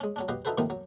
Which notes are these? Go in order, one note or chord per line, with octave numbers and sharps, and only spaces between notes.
G#3 C#4
F#3 C#4 D4
F#4 G4 B4 D#5 F5
D#4 E4 F#4 A4 B4 C5
A2 C3 D#3 F3 A#3 B3
F#3